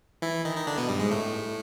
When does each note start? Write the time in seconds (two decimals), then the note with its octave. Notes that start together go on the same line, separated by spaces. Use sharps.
0.22 E3 E4
0.45 D#3 D#4
0.57 D#4
0.67 D3 D4
0.78 B2 B3
0.89 G2 G3
1.00 G#2 G#3
1.11 A2 A3